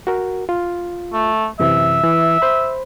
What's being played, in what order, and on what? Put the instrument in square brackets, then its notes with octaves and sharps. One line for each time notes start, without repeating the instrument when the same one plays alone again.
[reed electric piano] F#4 A#4
F4
[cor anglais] A3
[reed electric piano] F#2 C3 E3 [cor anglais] E5
[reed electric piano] E3
C5 B5